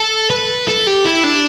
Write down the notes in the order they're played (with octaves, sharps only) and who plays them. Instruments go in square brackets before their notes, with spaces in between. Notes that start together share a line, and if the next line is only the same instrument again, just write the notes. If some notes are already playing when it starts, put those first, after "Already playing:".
Already playing: [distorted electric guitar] A4
B4
A4
G4
E4
D4